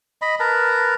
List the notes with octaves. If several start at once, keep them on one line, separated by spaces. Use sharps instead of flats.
D#5 B5
A#4 B4 A5 A#5